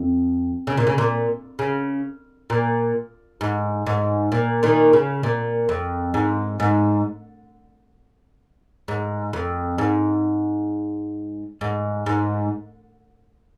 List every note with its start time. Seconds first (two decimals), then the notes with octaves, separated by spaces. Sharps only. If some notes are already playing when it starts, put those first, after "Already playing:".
Already playing: F2
0.67 C#3
0.77 A#2
0.87 C#3
0.98 A#2
1.59 C#3
2.50 A#2
3.41 G#2
3.86 G#2
4.32 A#2
4.63 A#2 D#3
4.93 C#3
5.23 A#2
5.69 F2
6.14 G#2
6.60 G#2
8.88 G#2
9.33 F2
9.78 G#2
11.61 G#2
12.06 G#2